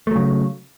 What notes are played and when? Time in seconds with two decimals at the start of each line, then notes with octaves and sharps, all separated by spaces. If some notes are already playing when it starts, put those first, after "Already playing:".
0.07 A3
0.11 F#3
0.16 C#3